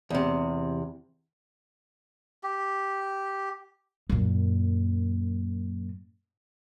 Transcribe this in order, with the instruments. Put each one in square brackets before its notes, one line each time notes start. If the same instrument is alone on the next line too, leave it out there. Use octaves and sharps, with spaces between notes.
[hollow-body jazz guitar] E2 C3
[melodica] G4
[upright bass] F#2 A#2